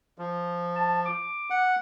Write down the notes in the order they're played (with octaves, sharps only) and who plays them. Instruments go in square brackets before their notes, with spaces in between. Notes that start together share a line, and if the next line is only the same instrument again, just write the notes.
[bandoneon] F3
[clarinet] A5
D6
[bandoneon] F#5